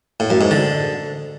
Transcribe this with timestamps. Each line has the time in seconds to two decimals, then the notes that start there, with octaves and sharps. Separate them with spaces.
0.20 A2
0.30 F#2
0.41 G#2
0.51 D3